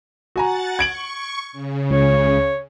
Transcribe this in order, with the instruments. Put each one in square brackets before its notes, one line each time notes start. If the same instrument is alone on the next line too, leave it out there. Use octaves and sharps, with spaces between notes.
[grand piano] F#4 G#5 A#5 [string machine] F#5 A6
[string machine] C#6 [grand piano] G#6 D7 F#7
[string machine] C#3
[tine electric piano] C#2 [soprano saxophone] C#5